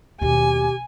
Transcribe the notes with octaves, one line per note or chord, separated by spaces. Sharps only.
D#2 B2 G4 G#5